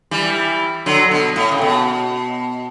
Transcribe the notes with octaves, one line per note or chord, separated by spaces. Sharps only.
E3 G3
D3 F#3
B2
A2
C#3
B2